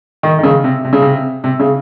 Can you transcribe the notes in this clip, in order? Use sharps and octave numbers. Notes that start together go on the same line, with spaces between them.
D#3
D#3
C#3
C3
C3
C#3
C3
C3
C#3